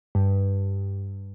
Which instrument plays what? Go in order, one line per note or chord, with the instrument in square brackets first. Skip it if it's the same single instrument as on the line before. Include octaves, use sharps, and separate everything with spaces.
[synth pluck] G2